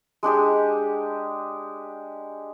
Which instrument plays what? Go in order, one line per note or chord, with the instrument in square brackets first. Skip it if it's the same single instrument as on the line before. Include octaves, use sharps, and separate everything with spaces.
[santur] G#3 D4 G4 G#4